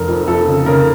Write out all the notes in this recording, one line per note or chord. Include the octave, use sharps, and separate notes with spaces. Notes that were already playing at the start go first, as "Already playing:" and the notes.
Already playing: F1 A#4
F2
F2 A4
C#3
C#3 A#4